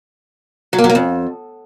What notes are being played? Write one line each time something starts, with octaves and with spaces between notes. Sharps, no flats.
F#3
A#3
F#3
A#3
F2